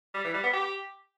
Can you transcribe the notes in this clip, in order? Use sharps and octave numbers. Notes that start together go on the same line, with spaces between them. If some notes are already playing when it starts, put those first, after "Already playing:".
G3
E3
G3
B3
G4